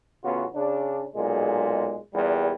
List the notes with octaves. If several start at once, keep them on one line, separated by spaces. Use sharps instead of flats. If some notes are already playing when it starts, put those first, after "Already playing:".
A1 C#3 B3 F4 F#4
C#3 D4
B1 A#2 G#3
E2 A#2 G3